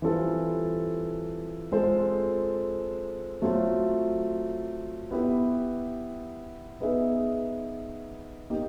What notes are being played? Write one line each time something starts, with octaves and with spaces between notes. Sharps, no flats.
E3 G3 C4 F4 A4
G#3 C4 F4 A4 C5
F#3 A3 C4 F4
B3 E4 G4 B4
B3 D#4 G#4 B4 E5
A#3 D#4 G4